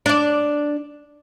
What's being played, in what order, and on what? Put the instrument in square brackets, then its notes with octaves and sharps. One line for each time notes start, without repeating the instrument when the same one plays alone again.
[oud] D4 D5